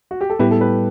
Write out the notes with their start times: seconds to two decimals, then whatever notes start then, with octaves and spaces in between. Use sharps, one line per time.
0.11 F#4
0.21 G4
0.30 A4
0.39 A2 G3 B3 E4 G4 B4
0.51 A4
0.61 G4 B4